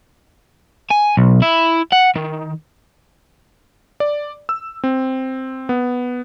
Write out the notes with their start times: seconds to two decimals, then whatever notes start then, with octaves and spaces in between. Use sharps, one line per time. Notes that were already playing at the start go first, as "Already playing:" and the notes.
0.90 G#5
1.17 B1
1.42 E4
1.93 F#5
2.16 D#3
4.00 D5
4.49 E6
4.84 C4
5.69 B3